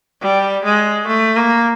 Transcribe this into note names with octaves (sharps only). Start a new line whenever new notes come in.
G3
G#3
A3
A#3